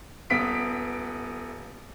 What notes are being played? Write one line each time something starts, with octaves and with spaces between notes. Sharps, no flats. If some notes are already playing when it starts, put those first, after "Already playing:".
D#1 B3 B6 D7